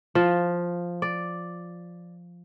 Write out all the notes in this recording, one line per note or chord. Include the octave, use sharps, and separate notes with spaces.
F3
D5